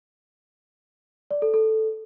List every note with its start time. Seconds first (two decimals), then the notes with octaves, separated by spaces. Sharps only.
1.31 D5
1.42 A4
1.54 A4